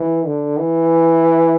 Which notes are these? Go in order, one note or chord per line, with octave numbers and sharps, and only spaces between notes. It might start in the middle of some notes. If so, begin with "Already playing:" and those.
Already playing: E3
D3
E3